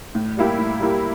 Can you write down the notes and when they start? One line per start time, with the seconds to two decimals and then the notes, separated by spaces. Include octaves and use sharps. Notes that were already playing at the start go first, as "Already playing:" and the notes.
0.15 A2
0.37 G3 A#3 E4 G4
0.59 A2
0.80 G3 A#3 E4 G4